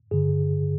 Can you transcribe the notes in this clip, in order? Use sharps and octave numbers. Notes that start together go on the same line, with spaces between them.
G2 D3 G#4